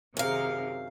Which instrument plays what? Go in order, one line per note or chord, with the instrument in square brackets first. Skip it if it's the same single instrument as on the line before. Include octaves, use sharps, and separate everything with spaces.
[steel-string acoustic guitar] F#2 F5 [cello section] C3 D#3 [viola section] G#4 A#4